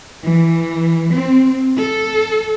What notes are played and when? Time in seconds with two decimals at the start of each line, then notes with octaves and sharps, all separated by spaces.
0.22 E3
1.15 C4
1.75 A4